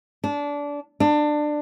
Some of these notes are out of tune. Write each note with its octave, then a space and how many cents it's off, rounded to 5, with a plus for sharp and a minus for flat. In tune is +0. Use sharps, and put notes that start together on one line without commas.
D4 -20
D4 +20